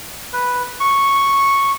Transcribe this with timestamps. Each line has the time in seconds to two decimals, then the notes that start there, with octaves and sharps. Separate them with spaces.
0.33 B4
0.80 C#6